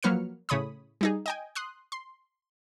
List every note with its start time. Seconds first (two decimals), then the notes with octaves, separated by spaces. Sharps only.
0.03 F3 F#3 A#3 B4 F6 C#7
0.49 A2 C#3 C#5 B5 D#6
1.01 G3 D#4 G#4
1.26 D#5 G5 G#5
1.55 C6 D#6 F#6
1.92 C6